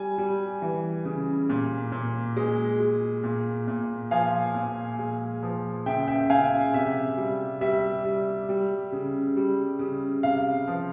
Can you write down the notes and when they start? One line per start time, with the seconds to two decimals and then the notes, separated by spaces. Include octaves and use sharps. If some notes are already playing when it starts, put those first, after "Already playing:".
Already playing: G3 G#5
0.18 G3
0.62 E3
1.05 C#3
1.49 A#2
1.92 A#2
2.36 G#3
2.79 G#3
3.23 A#2
3.68 A#2
4.11 F3 F5 G#5
4.54 A#2
4.99 G#3
5.43 F3
5.86 C#3 E5 G5
6.07 E5 G5
6.29 C#3 F5 G#5
6.73 C3 E5
7.17 G3
7.61 G3 E5
8.05 G3
8.49 G3
8.92 C#3
9.37 G3
9.79 C#3
10.23 C3 F5
10.68 F3